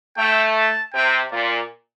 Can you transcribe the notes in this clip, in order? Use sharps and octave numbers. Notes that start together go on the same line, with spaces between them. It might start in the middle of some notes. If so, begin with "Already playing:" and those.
A3 G5
A5
C3 G5
A#2 D5